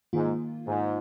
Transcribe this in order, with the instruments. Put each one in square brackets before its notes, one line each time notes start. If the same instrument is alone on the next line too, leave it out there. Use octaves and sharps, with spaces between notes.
[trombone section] G#2 [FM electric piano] D#3 A#3 F4
[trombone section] G#2